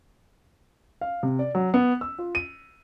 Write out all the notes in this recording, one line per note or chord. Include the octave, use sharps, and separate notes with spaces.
F5
C3
D5
F#3
B3
E6
F4
D#7